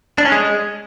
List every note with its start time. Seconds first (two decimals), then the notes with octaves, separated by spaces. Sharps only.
0.18 D4
0.25 C#4
0.32 G#3